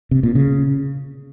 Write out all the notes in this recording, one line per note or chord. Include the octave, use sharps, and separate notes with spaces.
C3
A#2
C#3